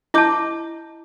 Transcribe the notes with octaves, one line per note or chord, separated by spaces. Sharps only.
E4 D#5 A5 D6 G6